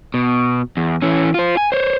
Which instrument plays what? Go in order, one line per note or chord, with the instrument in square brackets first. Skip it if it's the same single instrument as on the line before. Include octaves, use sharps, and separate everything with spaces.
[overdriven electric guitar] B2
E2
E3 C#4
F4 C5
G#5
C5 C#5